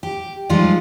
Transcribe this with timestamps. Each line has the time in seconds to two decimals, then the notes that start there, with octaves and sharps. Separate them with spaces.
0.03 G4
0.49 F3 G3 G#3 D#4 F4